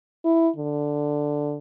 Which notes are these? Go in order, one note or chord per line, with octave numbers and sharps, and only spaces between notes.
E4
D3